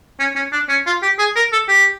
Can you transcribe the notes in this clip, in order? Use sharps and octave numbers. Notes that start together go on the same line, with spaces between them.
C#4
C#4
D4
C#4
F4
G4
G#4
A#4
A4
G4